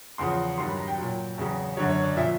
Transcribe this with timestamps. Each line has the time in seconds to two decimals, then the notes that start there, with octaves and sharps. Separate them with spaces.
0.18 E2 C#3 F3 C6
0.58 G2 D#3 F#3 C6
0.68 B5
0.77 A#5
0.88 G5
0.98 A#2 F#3
1.38 E2 C#3 F#3
1.77 F#2 D3 F#3 C#5
1.90 C#5
2.04 D5
2.16 A#2 F3 E5